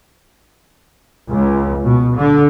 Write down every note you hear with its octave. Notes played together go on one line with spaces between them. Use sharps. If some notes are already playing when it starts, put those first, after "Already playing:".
C#2
B2
D3